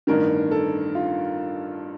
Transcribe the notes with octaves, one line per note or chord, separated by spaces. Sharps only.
A1 G2 D#3 A#4
A4
F4